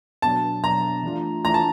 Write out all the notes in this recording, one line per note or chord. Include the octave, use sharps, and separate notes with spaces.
B2 F#3 B3 D4 A5
B2 F#3 B3 D4 A#5
E3 A3 D4 F4
E3 A3 D4 F4 A#5
A5